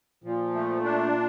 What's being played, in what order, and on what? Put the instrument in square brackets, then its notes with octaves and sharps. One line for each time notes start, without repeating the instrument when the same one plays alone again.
[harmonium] A#2 [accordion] F3
[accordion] A3
D4